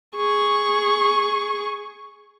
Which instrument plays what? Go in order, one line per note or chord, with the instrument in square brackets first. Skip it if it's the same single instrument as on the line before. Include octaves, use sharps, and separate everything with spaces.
[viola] G#4 C#6